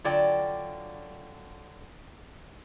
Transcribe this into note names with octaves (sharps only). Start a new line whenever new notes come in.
D3 F#3 F4 D5 G5